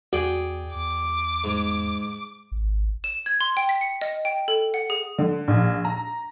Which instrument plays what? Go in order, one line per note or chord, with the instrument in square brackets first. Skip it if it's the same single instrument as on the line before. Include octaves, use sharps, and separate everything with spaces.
[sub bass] E2 [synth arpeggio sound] F#4 [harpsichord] G#4 D5 G5
[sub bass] E2 [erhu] D6
[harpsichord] G#2
[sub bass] G#1
[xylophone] E7
G#6
C6
G5
B6
C#7
D#5
G5
A4
F#5
G#4
[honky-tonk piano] D3
A#1
A#5